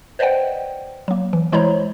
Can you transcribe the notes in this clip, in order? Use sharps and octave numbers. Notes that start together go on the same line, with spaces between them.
B4 C5 D5 D#5 F#5 G5
F#3 A#3
E3
E3 G#3 E4 C5 C#5 A#5